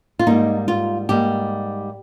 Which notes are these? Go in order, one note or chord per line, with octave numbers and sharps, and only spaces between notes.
F4
G#2 G3 A#3 D#4
F4
G#2 G3 A#3 G4